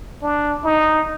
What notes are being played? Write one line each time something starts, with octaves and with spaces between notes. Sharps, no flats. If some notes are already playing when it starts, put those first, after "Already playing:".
D4
D#4